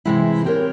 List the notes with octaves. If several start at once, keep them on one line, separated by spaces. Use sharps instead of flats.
C3 E3 G#3 E4
C4 G4 A#4 C#5